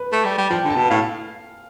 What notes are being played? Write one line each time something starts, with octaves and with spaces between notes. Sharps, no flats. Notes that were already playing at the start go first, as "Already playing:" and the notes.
Already playing: B4
A3
G3
G3
F3 G5
D3
A5
B2
A2 F5